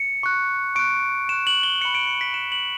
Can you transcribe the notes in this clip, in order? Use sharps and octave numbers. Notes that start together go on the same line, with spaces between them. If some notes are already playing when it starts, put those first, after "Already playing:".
Already playing: C#7
C#6 F#6
C#6 F#6 D7
C#6 F#6 E7
F#7
G7
B5 F#6 C#7
D7
C#7
B6
B5 F#6 E7
F#7